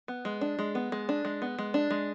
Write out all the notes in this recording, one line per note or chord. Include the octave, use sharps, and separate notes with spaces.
B3
G#3
D4
G#3
B3
G#3
D4
G#3
B3
G#3
D4
G#3